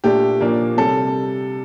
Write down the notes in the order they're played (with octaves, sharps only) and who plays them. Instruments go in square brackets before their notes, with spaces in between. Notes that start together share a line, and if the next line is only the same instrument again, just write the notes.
[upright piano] A#2 A3 D4 G4
A#2 F3 A#3 D4
C3 G3 A4